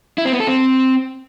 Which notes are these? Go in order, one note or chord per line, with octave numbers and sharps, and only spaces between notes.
E4
C4
B3
A4
C4